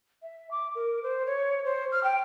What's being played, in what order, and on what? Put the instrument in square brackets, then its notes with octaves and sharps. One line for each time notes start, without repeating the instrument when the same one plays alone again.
[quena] E5
D6
A#4
C5
C#5
C5
F6
G5